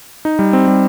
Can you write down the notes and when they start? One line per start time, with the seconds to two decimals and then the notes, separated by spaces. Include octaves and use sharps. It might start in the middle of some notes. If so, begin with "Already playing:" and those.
0.25 D#4
0.39 G3
0.53 C4
0.68 G3